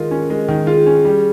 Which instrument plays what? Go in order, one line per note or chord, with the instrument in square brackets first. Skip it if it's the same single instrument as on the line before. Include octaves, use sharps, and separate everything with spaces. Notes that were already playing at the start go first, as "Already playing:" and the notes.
Already playing: [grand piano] D#3 G#3 F4 [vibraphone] A#4
[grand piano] C#4
G#3
D#3
[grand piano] F4 [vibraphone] G#4
[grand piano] C#4
G3